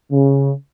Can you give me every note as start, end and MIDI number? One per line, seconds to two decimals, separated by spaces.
0.12 0.51 49